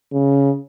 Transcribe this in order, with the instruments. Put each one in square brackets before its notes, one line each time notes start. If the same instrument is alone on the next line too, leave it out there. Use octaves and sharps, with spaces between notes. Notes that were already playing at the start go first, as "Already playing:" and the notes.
[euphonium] C#3